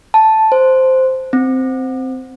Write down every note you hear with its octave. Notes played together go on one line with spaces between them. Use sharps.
A5
C5
C4